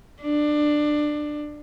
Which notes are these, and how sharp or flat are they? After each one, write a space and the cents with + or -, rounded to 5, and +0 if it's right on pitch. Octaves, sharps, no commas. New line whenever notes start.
D4 +20